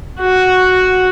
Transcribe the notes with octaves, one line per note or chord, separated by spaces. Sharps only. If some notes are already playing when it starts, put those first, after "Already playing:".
F#4